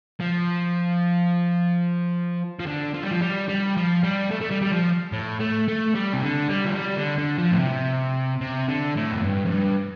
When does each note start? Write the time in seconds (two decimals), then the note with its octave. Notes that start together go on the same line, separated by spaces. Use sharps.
0.20 F3
2.59 F3
2.66 D3
2.94 F3
3.03 G3
3.11 F3
3.21 G3
3.49 G3
3.76 F3
4.03 G3
4.31 A3
4.41 A3
4.51 G3
4.62 G3
4.71 F3
5.12 A2
5.40 A3
5.68 A3
5.95 G3
6.13 C3
6.22 D3
6.49 G3
6.65 F3
6.77 G3
6.97 D3
7.18 D3
7.38 F3
7.52 A2
7.59 C3
8.41 C3
8.68 D3
8.96 A2
9.12 F2
9.23 G2
9.45 F2
9.50 G2